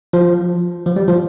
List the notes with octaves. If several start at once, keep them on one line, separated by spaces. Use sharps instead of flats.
F3
F3
G3
F3